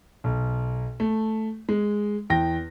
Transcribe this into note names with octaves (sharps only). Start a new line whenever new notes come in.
B1
A3
G#3
E2 G5 A#6